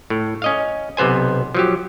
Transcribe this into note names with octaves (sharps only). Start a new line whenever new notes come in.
A2
C#4 D#5 F5
B1 C3 B3 C5 G#5
F3 F#3 G4